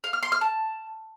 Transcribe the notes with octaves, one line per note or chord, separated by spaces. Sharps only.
F5
F6
C6
F6
A5